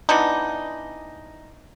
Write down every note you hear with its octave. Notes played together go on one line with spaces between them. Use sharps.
E3 B3 D4 D#4